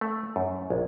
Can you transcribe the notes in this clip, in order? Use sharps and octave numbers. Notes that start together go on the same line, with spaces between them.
A3
F#2
A#1